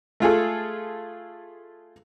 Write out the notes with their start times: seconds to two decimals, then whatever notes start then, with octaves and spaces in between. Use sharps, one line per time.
0.20 A3 F4 G#4 A4